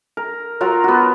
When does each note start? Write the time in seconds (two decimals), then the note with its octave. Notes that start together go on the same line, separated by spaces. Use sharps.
0.17 A#4
0.61 F#3 F4 A#4
0.84 B3 F#4